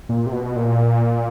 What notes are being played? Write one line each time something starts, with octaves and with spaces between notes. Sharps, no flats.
A#2
C3
B2
A#2